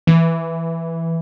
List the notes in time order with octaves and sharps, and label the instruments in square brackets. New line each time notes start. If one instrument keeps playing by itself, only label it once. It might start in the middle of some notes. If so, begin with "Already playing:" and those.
[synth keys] E3